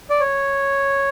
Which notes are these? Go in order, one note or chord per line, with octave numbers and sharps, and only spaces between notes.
D5
C#5